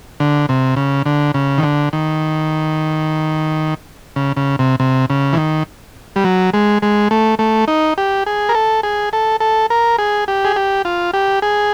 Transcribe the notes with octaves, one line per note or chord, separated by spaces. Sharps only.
D3
C3
C#3
D3
C#3
D#3
D3
D#3
C#3
C#3
C3
C3
C#3
E3
D#3
G3
F#3
G#3
G#3
A3
A3
D#4
G4
G#4
A#4
A4
G#4
A4
A4
A#4
G#4
G4
G#4
G4
F4
G4
G#4